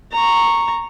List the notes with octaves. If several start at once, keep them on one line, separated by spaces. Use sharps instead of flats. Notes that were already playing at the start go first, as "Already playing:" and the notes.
A#5 C#6